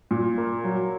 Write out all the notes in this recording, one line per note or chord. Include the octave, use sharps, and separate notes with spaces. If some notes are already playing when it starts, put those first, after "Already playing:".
A#2
A#3
F#3